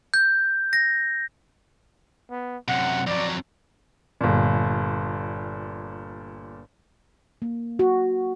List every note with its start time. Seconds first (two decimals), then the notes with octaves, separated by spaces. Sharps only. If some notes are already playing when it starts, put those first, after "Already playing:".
0.14 G6
0.73 A#6
2.31 B3
2.68 F#2 C3 F#5
3.07 F2 F#3 D5
4.21 G1 A#2
7.42 A#3
7.79 F#4